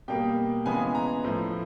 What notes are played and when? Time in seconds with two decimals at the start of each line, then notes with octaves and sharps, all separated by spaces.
0.08 B2 G3 A#3 G5
0.66 C#3 E3 G#3 B3 G#5
0.95 A#5
1.24 A2 F3 A3